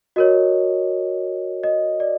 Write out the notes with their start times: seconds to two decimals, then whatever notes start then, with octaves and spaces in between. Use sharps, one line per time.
0.16 F#4 A#4 C#5 D#5
1.64 D#5
2.00 D5